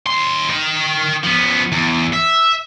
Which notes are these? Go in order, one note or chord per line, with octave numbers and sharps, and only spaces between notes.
D#2 C6
A#4 G5
F3 B3
E2
E5